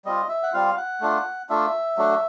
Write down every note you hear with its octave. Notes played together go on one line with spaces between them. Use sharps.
G3 C4 F4 D#5
E5
F#5
G3 C4 F4 F5
F#5
A3 D4 F4
A3 D4 F4 E5
F#3 A3 D4 F#4